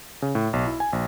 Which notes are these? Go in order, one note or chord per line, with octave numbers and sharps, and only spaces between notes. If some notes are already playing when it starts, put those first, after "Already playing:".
C#3
A2
B1
E4
G#5
A#1